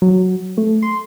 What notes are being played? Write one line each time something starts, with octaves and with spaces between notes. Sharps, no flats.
F#3
A3
C6